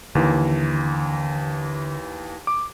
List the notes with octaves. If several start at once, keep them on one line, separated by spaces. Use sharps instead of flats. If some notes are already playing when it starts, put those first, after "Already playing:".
D#2 D3 E3
D6